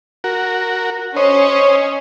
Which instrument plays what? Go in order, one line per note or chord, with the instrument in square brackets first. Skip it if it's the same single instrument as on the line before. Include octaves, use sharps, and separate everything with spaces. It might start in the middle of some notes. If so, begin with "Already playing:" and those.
[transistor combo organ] F#4 A#4
[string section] C#4 [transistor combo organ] C5 C#5 D#5